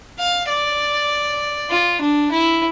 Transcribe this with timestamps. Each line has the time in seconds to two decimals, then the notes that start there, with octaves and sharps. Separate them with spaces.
0.19 F5
0.49 D5
1.70 F4
2.01 D4
2.31 E4